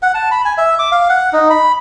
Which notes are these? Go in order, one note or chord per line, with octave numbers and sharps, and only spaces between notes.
F#5
A5
B5
G#5
E5
D6
F5
F#5
D#4
B5